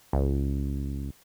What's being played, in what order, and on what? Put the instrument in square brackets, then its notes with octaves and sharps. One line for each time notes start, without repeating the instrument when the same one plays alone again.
[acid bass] C#2